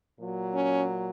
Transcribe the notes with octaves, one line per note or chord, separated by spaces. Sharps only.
A#2 F#3
C#4